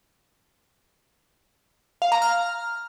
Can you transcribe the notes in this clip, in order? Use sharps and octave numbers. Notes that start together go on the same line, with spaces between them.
F5
A#5
F6